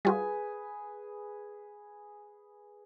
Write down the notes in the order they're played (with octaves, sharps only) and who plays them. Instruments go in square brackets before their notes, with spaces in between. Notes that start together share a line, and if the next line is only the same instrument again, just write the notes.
[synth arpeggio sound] G3 F4 F#4 [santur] G#4 B4 G#5